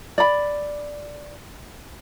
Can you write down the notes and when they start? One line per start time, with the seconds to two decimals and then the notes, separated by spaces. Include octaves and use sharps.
0.18 D5 B5